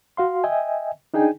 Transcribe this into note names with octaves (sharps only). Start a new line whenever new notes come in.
F#4 F5 C6
D#5 E5 G5 G#5
D4 D#4 G#4 G5 G#5